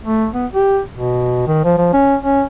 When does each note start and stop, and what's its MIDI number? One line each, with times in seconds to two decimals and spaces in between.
0.04 0.27 57
0.34 0.46 59
0.54 0.80 67
0.93 1.44 47
1.47 1.62 51
1.65 1.74 53
1.77 1.92 53
1.93 2.16 61
2.23 2.43 61